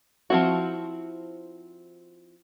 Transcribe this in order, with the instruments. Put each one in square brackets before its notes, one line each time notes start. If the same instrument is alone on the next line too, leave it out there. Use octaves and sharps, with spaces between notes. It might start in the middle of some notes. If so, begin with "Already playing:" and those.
[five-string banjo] F3 F#3 C4 E4 F#4